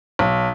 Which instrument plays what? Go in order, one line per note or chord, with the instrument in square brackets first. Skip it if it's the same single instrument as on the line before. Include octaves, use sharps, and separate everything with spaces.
[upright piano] B1